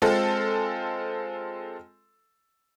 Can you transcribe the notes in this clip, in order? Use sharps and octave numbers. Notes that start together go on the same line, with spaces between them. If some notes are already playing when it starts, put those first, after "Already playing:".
G#3 C4 F4 A4